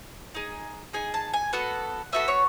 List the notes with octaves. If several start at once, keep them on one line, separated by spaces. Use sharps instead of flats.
D#4 G#4
D#4 G#4 G#5
A5
G#5
B3 F#4 A4 F#5
B3 F#4 A4 E5
C#5